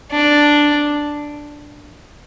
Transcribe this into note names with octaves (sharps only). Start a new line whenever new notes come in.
D4